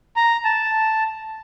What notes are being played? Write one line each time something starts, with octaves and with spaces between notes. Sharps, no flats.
A#5
A5